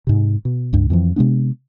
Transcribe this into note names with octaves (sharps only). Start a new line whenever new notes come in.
G#2 C3
B2
C#2 G2
F2 E3 F3
C3 G#3 B3 D4